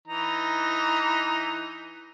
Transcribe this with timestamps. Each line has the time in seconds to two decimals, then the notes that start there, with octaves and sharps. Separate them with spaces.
0.08 E3 D#4 A#5